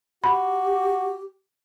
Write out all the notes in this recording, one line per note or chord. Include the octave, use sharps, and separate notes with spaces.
F#4 G4 B5